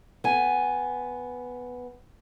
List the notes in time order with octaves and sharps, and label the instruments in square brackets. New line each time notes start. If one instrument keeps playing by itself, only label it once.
[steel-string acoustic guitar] B3 G#5